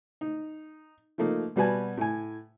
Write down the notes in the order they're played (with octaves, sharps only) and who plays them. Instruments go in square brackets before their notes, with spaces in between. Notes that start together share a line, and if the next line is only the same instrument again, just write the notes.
[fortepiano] D#4
F3 A3 A#3 D#4
B2 G3 F#4 B4 G#5 A5
A2 G#5